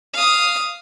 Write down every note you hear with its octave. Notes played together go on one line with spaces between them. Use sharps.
F5 D#6